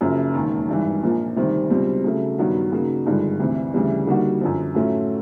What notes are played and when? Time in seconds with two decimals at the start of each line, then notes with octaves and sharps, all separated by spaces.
0.01 F#1 F#2 C#3 F3
0.34 E1 D#2 D#3
0.68 G#1 G2 E3
1.03 A#1 A#2 F3 A#3
1.36 D2 C3 D#3 G3 C4
1.70 C#2 B2 G3 C4
2.04 C#3 F#3 A3
2.38 G2 D#3 F#3 B3
2.72 C#3 F#3 A#3 D#4
3.06 G#1 G2 D3 F3 G#3
3.40 D2 C3 E3
3.74 D2 C#3 E3 G3
4.07 D3 G3 A#3 D#4 F#4
4.41 F#2 D3 F3
4.75 A2 F#3 A3 C#4 F4